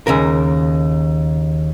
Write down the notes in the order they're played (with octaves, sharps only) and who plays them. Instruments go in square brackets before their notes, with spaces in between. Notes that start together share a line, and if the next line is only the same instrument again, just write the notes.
[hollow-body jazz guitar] D#2 C#3 A#4